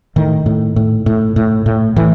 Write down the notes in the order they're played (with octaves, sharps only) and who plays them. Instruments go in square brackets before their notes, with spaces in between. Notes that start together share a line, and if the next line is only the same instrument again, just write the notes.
[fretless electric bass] A2 D#3
A2
A2
A2
A2
A2
A2 E3